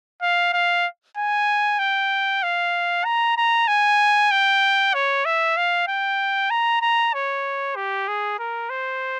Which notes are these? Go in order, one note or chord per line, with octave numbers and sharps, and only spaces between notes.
F5
F5
G#5
G5
F5
A#5
A#5
G#5
G5
C#5
E5
F5
G5
A#5
A#5
C#5
G4
G#4
A#4
C5